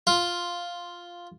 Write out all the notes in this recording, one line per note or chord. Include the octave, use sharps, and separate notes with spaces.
F4